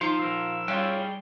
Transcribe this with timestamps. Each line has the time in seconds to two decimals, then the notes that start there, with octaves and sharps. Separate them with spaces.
0.01 F3 D#4 F4 F5 A#5
0.19 F3 A#4 E6
0.68 G3 C#4 F4 G#4 D5 G5